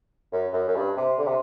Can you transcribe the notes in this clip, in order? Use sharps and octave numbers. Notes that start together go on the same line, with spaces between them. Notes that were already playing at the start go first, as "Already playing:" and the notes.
F#2
F#2
F#2
G2
C3
D3
C3